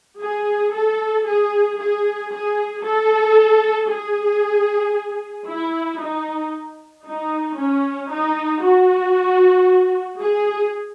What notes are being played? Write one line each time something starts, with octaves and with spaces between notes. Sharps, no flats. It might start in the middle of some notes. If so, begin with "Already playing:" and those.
G#4
A4
G#4
G#4
G#4
A4
G#4
E4
D#4
D#4
C#4
D#4
F#4
G#4